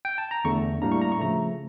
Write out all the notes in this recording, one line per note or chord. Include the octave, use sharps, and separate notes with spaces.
G5
A5
A#5
E2 D3 A3 C#6
A2 G3 A#3 D4 A#5
C#6
A#5
C#6
C#3 F3 A3 A#5